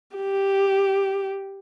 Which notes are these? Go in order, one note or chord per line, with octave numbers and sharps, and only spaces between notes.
G4